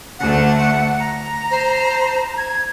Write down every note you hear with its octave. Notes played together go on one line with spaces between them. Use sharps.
D2 A3 F#5
A#5
C5
G#6